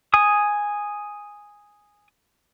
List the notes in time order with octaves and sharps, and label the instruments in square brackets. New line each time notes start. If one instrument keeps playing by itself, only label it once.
[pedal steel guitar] G#5 D#6